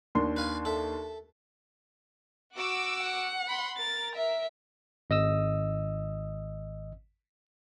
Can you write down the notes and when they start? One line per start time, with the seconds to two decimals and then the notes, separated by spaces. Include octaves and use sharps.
0.15 D#2 D4 C6
0.36 B4 F5 G#5
0.65 A4 E5
2.54 F#4 D6 E6
3.00 F#5
3.47 B5 C6
3.77 A#4 A6
4.16 E5
5.10 G#1 D#5 D#6 E6